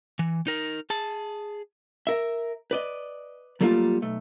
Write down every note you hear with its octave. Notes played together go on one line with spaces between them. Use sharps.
E3
D#4 A#4
G#4 A5
A#4 E5
B4 D5 D#5
F#3 G3 A3 A#3 D#4 F4
B1 A3